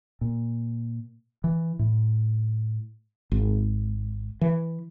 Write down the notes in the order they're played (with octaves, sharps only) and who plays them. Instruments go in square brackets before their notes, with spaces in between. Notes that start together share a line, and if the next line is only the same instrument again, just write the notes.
[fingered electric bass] A#2
E3
A2
[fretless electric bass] G#1
E3